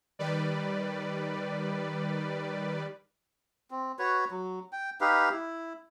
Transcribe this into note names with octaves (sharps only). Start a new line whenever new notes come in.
D#3 G3 B4 D5
C4
F#4 B4 C#5
F#3
G5
D#4 G4 B4 F5
E4